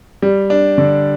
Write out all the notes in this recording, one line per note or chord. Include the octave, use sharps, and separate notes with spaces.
G3
D4
D3